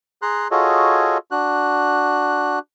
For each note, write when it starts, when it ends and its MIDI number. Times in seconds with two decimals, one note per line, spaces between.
0.22 0.48 68
0.22 0.48 82
0.22 0.48 84
0.22 0.48 90
0.51 1.18 65
0.51 1.18 66
0.51 1.18 68
0.51 1.18 69
0.51 1.18 73
0.51 1.18 75
1.31 2.59 62
1.31 2.59 66
1.31 2.59 90